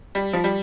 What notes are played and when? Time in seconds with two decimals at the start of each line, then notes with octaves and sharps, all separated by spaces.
0.15 G3
0.33 F3
0.44 G3